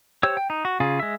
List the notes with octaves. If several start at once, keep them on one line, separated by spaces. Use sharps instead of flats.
G4 C5 C#5 E6
G5
D#4
F#4
C#3 F4 G#4
G#3 E5